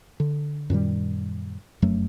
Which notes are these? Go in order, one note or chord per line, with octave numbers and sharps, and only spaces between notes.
D3
F#2 A#2 D#3 G3
F1 F#2 F#3 A3